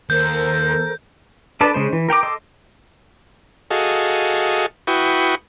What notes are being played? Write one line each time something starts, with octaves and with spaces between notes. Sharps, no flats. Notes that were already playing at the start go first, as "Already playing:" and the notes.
D#2 A4 A#4 C5 G6
D4 A4 B4 D5 A5
C#3 G#3 C5
E3
A#4 G5 A#5 D6
A4 D#5 C6 D6
F#4 G#4 A4 D#5 F5
E4 F#4 B4 G5 C#6 D#6